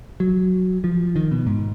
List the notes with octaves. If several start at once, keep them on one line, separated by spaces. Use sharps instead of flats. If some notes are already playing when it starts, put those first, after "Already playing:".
F#3
F3
D#3
B2
G#2